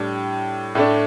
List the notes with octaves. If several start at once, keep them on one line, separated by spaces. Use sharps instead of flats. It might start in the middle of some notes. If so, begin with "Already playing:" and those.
Already playing: A2 G3 D4
A2 A3 D4